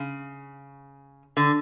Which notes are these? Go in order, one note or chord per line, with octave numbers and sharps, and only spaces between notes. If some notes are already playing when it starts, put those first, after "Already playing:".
Already playing: C#3
D3